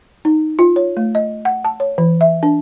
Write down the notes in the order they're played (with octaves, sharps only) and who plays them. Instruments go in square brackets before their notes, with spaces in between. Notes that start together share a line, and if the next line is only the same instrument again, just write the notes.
[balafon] D#4
F4
C#5
A3
D#5
F#5
A5
C#5
E3
E5
D4